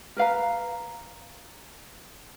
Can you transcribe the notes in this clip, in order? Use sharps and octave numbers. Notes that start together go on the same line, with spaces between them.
A#4 B4 F5 A#5